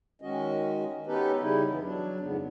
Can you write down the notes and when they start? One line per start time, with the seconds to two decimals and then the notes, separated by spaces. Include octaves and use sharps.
0.22 D#3 G#3 C#4 F#4 D#5
1.07 B3 C#4 D#4 G4 A4 B4
1.40 C#3 G3 D#4 E4
1.69 F2 E3 B3
1.81 F#3 D4
2.20 F2 G#2 C#3 B3